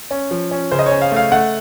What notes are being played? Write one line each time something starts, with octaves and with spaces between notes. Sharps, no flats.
C#4
F3
C#4
C#3 C5
D#5
C#5
C#4
F5
A3 F5
A3 F#5